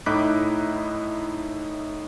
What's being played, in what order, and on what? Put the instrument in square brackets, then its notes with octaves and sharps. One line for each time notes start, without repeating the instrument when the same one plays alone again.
[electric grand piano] A2 D#4 E4 D6 F#6 B6